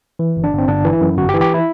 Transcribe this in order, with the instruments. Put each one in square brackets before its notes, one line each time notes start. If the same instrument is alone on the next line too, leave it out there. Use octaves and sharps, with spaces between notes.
[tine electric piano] E3
G1
D4
G1
C4
G1 D4
E3
E4
F#2
G1 F#4
G4
E3
G4
E4